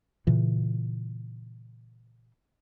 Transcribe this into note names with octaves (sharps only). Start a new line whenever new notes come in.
A#2 C#3 E3